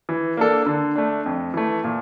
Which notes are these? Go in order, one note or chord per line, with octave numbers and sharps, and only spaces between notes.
E3
A#3 D4 A4
D3
A3 D4
F2
E3 A3
A#2